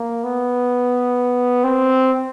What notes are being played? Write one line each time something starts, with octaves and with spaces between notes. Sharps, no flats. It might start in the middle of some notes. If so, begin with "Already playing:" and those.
Already playing: A#3
B3
C4